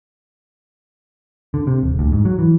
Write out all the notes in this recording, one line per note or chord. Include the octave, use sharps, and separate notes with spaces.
D3
C3
D#1
D2
G#2
F#3
E3